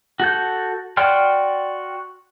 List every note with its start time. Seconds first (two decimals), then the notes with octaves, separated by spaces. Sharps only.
0.20 F#4 A4 G6
0.97 F#4 D5 G5 C6 F6